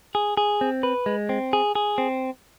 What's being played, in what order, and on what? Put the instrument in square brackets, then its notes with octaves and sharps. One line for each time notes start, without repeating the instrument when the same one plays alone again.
[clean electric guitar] G#4
G#4
C4
B4
G#3
C4
G#4
G#4
C4